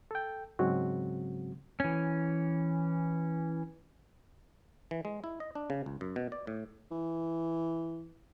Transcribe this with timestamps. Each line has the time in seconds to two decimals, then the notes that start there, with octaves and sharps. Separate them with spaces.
0.11 A4 G5
0.59 G#2 C#3 F#3 G#3 C4 F#4
1.80 E3 C#4
4.91 E3
5.05 G#3
5.24 E4
5.40 D#5
5.55 D4
5.70 C#3
5.86 C#2
6.01 F#2
6.16 B2
6.32 D5
6.47 A2
6.91 E3